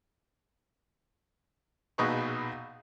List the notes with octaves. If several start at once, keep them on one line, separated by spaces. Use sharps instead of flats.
A#1 B2 D#4 G#4 B4 C#6